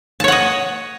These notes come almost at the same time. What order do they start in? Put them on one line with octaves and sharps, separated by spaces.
A5 C#5 F#5 D#5